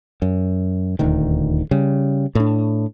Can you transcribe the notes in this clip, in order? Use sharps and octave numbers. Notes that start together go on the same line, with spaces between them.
F#2
D#1 D2 D#3
C#3 G3
A2 D4